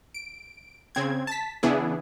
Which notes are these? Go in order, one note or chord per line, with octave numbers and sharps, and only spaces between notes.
D7
C#3 C4 G#6
A5 B6
C#3 E3 B3 D4 E4 G#4